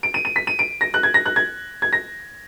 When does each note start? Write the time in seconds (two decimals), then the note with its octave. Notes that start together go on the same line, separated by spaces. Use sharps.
0.03 D7
0.14 D#7
0.25 D#7
0.36 B6
0.47 D#7
0.59 D7
0.81 A#6
0.94 F#6
1.03 G#6
1.14 A#6
1.26 F#6
1.36 G#6
1.82 G#6
1.93 A#6